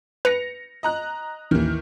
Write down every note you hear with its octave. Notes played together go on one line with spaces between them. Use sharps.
B4 A#6 C#7 F7
D#5 A#5 F#6
A1 D#2 D#3 E3